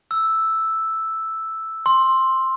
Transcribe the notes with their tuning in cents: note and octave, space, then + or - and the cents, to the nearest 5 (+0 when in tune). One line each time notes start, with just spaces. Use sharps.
E6 +0
C6 +10